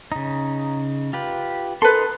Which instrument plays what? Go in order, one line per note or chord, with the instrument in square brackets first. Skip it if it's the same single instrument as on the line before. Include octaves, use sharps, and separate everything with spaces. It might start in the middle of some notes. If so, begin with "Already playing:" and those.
[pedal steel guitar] C#3 D#4
F4 G4 B4
[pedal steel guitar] D#4 C6 [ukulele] A4 B4